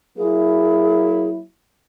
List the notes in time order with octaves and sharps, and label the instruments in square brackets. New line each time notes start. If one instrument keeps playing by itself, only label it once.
[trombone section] F#3 A#3 E4 [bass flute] G#4